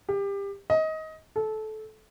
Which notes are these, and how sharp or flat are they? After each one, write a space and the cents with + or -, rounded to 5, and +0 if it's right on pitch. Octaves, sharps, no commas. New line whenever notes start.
G4 +25
D#5 +20
A4 -20